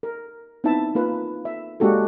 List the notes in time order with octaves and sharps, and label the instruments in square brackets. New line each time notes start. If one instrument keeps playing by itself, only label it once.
[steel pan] A#4
B3 C4 D#4 E4 E5 A5
A#3 F4 B4
E5
G#3 A#3 D4 F#4 G4 A4